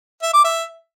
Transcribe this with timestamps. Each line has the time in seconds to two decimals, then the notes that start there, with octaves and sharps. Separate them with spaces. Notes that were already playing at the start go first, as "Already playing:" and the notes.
0.23 E5
0.34 D6
0.44 E5